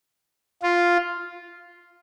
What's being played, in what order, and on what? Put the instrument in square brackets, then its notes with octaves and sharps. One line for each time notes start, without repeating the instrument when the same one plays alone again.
[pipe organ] F4